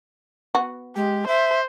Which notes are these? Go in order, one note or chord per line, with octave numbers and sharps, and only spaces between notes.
B3 F#4
G#3 G4
C5 E5